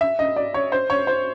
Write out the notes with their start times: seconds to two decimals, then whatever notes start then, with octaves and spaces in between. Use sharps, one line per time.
0.01 E5
0.19 D#5
0.36 D5
0.54 C#5
0.72 C5
0.90 C#5
1.07 C5